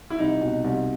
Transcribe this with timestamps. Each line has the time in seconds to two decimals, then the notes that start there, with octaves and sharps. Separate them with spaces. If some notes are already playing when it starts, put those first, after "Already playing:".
0.10 E4
0.19 C2 D#4
0.41 B2
0.64 C2